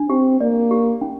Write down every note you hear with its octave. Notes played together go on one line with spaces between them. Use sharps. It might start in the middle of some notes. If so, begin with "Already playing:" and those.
Already playing: D4
C4 G4
A#3 D5
G4
C#4